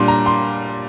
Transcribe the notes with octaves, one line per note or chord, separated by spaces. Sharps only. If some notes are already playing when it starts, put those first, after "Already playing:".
Already playing: A#2 G3 D4 C6
A#5
C6